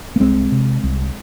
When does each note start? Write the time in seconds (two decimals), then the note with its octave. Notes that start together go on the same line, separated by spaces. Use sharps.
0.16 A#3
0.20 C2 G#3 C4
0.52 C3
0.83 C2